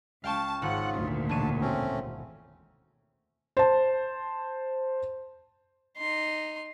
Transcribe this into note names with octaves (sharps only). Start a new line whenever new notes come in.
C#2 F5 G5 A5 C#6
G#1 G#2 C#3 F4 F#5
D2 A#2
E1 D4 C#5 A5 D#7
A3 C4 C#4
C5 A5
D#4 C6